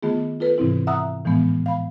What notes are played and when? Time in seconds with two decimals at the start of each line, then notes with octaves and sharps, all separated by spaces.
0.03 D#3 A3 B3 F4 G#4
0.40 F4 A4 B4
0.58 G#2 C3 E3 C4 E4
0.87 E5 F#5 A#5 D#6 E6 F#6
1.25 A2 E3 F3 G#3 B3
1.66 F5 B5